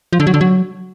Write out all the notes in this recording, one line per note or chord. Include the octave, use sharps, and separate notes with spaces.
F3
D3
F#3
D3
F#3